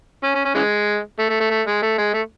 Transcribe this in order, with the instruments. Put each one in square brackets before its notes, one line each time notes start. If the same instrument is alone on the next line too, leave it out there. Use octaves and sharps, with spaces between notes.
[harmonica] C#4
C#4
C#4
C#3 E3 G#3
A3
A3
A3
A3
G#3
A3
G#3
A3